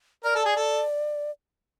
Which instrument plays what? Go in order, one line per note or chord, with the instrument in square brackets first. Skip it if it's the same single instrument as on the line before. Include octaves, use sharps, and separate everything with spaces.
[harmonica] A#4 [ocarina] D5
[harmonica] A4
G#4
A4